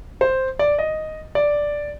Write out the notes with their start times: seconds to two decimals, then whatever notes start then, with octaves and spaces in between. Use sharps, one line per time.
0.21 C5
0.59 D5
0.79 D#5
1.35 D5